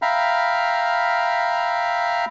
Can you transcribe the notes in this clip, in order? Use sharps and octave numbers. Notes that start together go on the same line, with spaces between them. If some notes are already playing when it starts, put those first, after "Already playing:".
E5 F5 G5 A#5 B5 F6